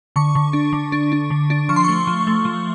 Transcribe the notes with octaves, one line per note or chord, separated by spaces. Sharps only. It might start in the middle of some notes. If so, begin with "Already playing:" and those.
D3 C#6
D3
D4
D3
D4
D4
D3
D4
F3 C#6
C6
A3 C#6
F3
A3
F3